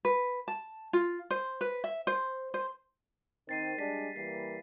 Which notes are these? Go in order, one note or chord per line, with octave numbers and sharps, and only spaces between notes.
B4
A5
F4
C5
B4
E5
C5
C5
D#3 C4 A6 C7 D#7
G3 G#3 D4 B6
E3 G3 A#3 C7